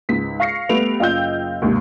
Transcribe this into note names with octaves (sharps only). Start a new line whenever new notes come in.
C#2 G#2 B6
F5 C#6 F6 A#6 C7 C#7
G3 A3 B3 D7 F7
F#1 F4 D#5 G5 E6 G6
D#2 G#2 C3